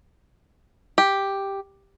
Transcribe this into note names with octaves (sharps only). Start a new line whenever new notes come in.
G4